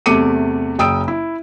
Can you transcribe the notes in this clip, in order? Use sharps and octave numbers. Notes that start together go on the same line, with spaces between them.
E2 C3 A3 D6 C#7 D#7
F#1 G5 D#6 E6 D7
E4